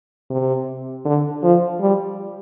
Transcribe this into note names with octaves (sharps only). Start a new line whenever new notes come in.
C3
D3
F3
G3